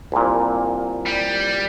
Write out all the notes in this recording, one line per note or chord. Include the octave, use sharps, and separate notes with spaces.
C2 A#2
G3